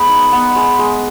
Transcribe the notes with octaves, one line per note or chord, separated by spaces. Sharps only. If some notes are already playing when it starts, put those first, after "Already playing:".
Already playing: G#3 B3 G#4 B4
D#4
B3
G#3
G#3